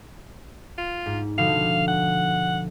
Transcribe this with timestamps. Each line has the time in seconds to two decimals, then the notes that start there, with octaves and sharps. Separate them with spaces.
0.78 F4
1.06 G#2
1.38 B2 D3 F3 F5
1.88 F#5